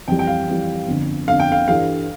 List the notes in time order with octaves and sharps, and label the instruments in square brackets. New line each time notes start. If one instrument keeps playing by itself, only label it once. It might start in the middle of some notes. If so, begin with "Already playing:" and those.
[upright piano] F2 E3 G3 [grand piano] G5
[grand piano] G5
F5
[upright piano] F2 E3 G3
G1 F2 D3
[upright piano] G1 F2 D3 [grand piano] F5
[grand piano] G5
F5
[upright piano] G2 E3 G3 D4 A4 [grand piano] F5